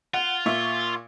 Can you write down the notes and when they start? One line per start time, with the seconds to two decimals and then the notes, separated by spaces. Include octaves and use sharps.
0.14 F4 F#5
0.46 A#2 E5 C#6